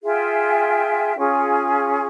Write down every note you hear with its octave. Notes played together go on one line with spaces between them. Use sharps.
F4 G#4 E5 G5
C#4 F4 G#4